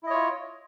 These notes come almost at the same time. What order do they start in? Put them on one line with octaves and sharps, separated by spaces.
E4 D#5 C#5 F4